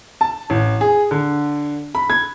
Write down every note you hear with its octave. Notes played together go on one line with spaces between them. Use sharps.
A5
A1
G#4
D3
B5
G#6